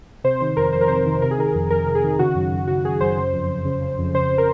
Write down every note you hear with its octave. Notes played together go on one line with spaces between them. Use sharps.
C3 C5
D#3 C5
F2 A#4
F2 C5
A#4
C3 C5
D#3
C3 A#4
G#4
D#3 A#4
F2
F2 A#4
C3
G#4
D#3
C#3 F#4
F#2
F#2
C#3 F#4
C#3 G#4
F#2 C5
C#3
F2
F2
C#3
C#3
F2
C#3 C5
A#4